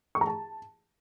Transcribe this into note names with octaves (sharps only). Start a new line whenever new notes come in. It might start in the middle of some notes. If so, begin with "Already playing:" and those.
C#6
A#5
A5